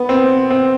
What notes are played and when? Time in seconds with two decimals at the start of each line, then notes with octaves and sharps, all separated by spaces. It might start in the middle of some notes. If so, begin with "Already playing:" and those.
Already playing: B3
0.09 C4
0.51 C4